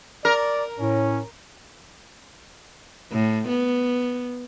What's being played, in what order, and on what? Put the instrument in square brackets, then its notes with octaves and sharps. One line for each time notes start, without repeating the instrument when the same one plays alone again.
[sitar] A#4 [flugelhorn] D5
[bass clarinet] A2 [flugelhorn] C#4
[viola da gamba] A2
B3